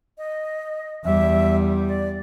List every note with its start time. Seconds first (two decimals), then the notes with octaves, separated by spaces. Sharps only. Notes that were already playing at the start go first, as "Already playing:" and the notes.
0.18 D#5
1.04 E2 G3 E5
1.88 D5